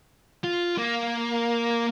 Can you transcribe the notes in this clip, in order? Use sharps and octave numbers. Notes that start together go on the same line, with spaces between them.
F4
A#3